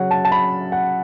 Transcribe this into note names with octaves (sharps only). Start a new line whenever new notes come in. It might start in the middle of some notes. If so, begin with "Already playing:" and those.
Already playing: C#3 F#3 C#4 F#5
A5
A5
B5
F#5